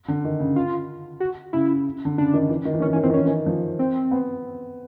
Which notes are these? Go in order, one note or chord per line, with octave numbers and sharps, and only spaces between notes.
D3
D#3
C#3
F4
F#4
C#3 E4
D3
C#3 D4
D#3
E3
D#3
E3
D#3 C#4
E3
C#4
D#3
E3 C4
D#3
E3 C#4
D#3
F3
C4
B3